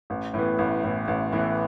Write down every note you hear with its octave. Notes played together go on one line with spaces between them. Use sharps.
A1
A2 E3 B3
A1
A2 E3 B3
A1
A2 E3 B3